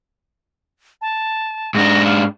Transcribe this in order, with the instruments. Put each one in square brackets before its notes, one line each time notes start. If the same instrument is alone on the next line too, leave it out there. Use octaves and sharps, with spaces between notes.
[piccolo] A5
[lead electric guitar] G#2 D4 [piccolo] A#6
[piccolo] F5